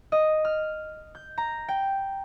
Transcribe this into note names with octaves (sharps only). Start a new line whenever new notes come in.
D#5
F6
G6
A#5
G5